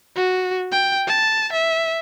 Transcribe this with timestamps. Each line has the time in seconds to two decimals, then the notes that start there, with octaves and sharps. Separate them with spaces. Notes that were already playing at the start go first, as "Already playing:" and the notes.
0.16 F#4
0.72 G5
1.07 A5
1.53 E5